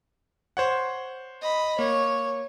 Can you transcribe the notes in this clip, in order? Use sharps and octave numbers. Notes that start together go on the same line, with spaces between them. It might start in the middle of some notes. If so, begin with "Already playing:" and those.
C5 C#5 F#5
D#5 B5
A#3 C#5